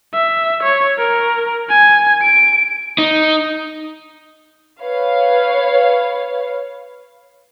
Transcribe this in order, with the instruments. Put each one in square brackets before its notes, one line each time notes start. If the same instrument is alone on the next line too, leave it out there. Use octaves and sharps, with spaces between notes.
[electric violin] E5
C#5
A#4
G#5
D7
[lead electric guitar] D#4
[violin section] B4 C#5 F5